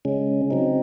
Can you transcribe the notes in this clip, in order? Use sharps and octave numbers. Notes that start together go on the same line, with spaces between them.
C#3 G#3 C#4
C#3 F#3 C4 D#4